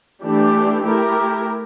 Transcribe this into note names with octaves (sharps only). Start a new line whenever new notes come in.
E3 A3 D4 G4
A3 E4 G4 A#4